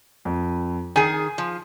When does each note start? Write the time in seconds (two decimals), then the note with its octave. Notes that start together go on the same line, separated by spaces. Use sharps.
0.25 F2
0.96 D#3 G#4 G#5 D#7
1.38 F3